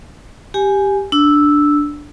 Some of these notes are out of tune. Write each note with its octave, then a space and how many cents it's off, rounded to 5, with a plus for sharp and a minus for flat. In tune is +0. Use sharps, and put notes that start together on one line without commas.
G4 +0 G#5 +0
D4 +0 E6 -5